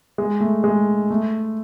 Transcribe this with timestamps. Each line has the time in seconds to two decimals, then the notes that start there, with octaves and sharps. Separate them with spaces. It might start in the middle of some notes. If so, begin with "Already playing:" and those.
0.18 G#3
0.41 A3
0.64 G#3
1.10 A3